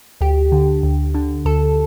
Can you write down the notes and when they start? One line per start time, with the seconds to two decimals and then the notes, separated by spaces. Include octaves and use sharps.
0.21 D2 G4
0.52 D3
0.83 D2
1.14 D3
1.45 D2 A4